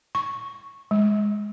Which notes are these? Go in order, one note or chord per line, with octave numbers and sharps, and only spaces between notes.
C#6
G#3